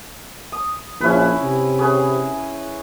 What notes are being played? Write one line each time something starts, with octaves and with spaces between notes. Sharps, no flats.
D#6
A#1 C#4 E4 B4
C3
C#4 G#4 B4